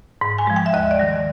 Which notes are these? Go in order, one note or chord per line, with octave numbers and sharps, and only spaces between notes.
G#2
G#5
F3 G#3
G5
E5
D#2 D#5
D5
D#3 G3
D5